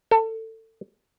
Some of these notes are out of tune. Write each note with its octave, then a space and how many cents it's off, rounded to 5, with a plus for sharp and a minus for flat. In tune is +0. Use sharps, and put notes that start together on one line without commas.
A4 +25